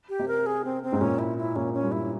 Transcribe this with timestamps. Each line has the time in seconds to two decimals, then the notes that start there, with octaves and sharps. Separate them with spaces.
0.09 G4
0.19 C3
0.28 A#4
0.46 G#4
0.64 C4
0.83 C4
0.92 G#2
1.01 A#2 C#4
1.19 E4
1.38 E4
1.56 A#2 C#4
1.74 C#4
1.83 G2
1.92 E4